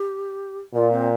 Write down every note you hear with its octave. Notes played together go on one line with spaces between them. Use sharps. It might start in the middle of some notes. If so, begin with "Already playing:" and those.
Already playing: G4
A#2 F4
C4